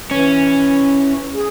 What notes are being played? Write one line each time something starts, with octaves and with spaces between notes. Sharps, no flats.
E3 C#4
G#4